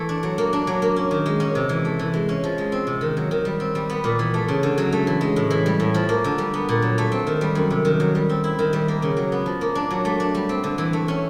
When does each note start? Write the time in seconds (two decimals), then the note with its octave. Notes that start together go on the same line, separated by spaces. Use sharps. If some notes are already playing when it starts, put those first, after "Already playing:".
Already playing: E3 A3
0.09 D4
0.23 F#3
0.38 A#3
0.53 D4
0.67 F#3
0.82 A#3
0.96 C#4
1.11 D#3
1.26 G#3
1.40 C#4
1.55 C3
1.69 E3
1.85 A3
1.99 E3
2.14 G#3
2.29 C#4
2.44 F3
2.58 G#3
2.72 C4
2.87 C3
3.01 D#3
3.17 F#3
3.31 D#3
3.45 G3
3.60 C4
3.75 G3
3.90 B3
4.04 A#2
4.19 E3
4.34 A3
4.48 C#3
4.63 D3
4.78 F#3
4.92 A3
5.07 E3
5.21 G#3
5.36 A2
5.50 E3
5.66 G3
5.80 A2
5.94 F3
6.09 A#3
6.24 D3
6.38 G3
6.54 B3
6.69 A#2
6.82 F#3
6.98 A3
7.12 C4
7.27 D#3
7.41 G3
7.55 F#2
7.70 C3
7.85 D#3
8.00 F#3
8.15 G3
8.29 C4
8.44 E4
8.59 D#3
8.73 G3
8.88 A#3
9.02 C#3
9.17 F#3
9.32 B3
9.46 F3
9.61 A#3
9.75 D4
9.90 F#3
10.05 A3
10.20 D4
10.35 G3
10.49 C4
10.64 D3
10.78 E3
10.93 A3
11.08 C#4